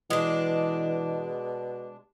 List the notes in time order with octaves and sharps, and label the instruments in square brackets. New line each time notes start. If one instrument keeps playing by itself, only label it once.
[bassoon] B2 [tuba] E3 [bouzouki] G#3 D4